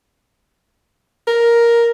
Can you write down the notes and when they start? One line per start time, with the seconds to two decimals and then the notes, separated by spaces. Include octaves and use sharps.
1.27 A#4